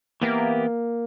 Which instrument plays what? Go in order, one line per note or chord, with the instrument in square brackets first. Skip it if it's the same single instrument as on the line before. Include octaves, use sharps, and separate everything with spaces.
[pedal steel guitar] E3 B3 E4 G4 A#4 [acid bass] A#3